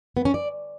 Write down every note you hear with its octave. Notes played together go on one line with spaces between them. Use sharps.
B3
C#4
D5